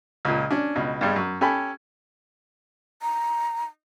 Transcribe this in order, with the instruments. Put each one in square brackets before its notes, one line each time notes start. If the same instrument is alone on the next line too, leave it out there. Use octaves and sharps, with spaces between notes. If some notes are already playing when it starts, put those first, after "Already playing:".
[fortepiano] C#2 A#2
C#4 D4
C#2 B2
G2 G3 G#3
F#2
C#4 G4 A4 G#5 B5
[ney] A#5